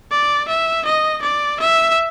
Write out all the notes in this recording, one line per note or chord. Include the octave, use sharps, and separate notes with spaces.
D5
E5
D#5
D5
E5